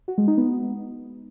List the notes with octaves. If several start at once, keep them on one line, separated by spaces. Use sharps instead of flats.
F#4
G#3
D#4
B3